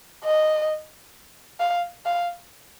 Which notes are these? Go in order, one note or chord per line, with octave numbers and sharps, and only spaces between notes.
D#5
F5
F5